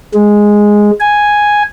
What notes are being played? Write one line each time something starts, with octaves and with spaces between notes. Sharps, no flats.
G#3
G#5